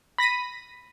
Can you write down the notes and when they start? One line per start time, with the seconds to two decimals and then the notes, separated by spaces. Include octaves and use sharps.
0.18 B5 A#6 B6 D#7